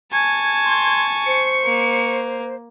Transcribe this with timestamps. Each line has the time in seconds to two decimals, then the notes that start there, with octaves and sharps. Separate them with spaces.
0.12 G#5 A5 C#6 G#6
0.65 C6
1.26 C5 C#7
1.65 A#3